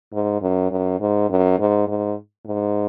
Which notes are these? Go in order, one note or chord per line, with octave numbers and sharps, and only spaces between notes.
G#2
F#2
F#2
G#2
F#2
G#2
G#2
G#2